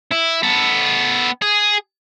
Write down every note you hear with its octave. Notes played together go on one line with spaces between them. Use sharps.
E4
B3 A4
G#4